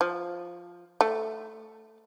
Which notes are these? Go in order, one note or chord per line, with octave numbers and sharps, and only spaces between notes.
F3
A3